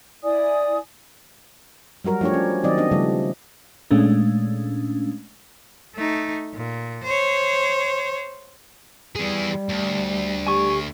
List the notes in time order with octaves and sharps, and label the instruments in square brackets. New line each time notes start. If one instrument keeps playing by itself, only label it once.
[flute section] E4 D5 G#5 D#6
[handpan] F#3 G3 F#4 A#4
F3 A3 D4 G4 C#5
C#4
D#3 F#3 C4 D5 D#5
B3 D4 D#5
C#3 F3 G3 A3
[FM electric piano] A#2 G#3 A3 C#4 D4
[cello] A3 D#4
A#2
C5 C#5
[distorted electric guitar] E3 G#4 [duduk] G3
[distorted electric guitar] D2
[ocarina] G4 [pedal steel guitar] G#5 C#6